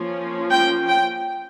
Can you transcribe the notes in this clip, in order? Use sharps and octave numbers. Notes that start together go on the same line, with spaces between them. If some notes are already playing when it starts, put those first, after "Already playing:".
Already playing: F3 A#3 C#4
G5
G5